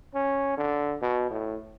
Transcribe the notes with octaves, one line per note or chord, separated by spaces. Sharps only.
C#4
D3
B2
A2